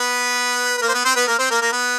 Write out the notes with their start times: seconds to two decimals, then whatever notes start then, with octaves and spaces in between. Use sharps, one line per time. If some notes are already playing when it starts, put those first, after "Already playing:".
Already playing: B3 B4
0.78 B4
0.82 A#3 A#4
0.88 C5
0.94 B3 B4
1.05 C4 C5
1.16 B3 B4
1.27 A#3 A#4
1.39 C4 C5
1.51 A#3 A#4
1.61 A#3 A#4
1.72 B3 B4